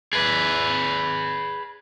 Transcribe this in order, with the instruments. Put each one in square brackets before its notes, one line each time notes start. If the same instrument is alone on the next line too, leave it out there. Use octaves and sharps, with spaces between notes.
[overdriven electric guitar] G#4 B4